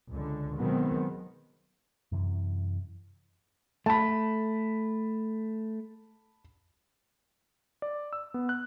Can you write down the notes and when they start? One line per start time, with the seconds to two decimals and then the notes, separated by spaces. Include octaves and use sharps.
0.10 C#2 D3
0.57 B2 D#3 F#3 G#3 B3 C4
2.12 F#2 C3 E3
3.86 A3 A5 B5
7.82 D5
8.13 E6
8.34 B3
8.49 F#6